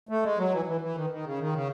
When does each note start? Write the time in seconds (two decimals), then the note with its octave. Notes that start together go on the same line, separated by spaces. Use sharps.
0.09 A3
0.23 G#3
0.37 F#3
0.51 E3
0.66 E3
0.81 E3
0.95 D#3
1.10 D#3
1.24 C#3
1.39 D#3
1.53 C#3